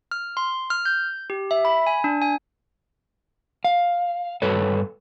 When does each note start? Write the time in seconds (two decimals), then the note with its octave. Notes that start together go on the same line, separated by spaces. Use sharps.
0.11 F6
0.37 C6
0.70 F6
0.85 G6
1.30 G4
1.51 E5
1.65 B5
1.87 G#5
2.04 D4
2.22 G#5
3.65 F5
4.42 G2 A4 B4 C#5